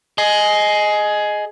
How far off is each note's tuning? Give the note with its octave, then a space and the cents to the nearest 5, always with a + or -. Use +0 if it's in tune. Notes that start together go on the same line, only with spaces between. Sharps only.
G#4 +15 D#5 -5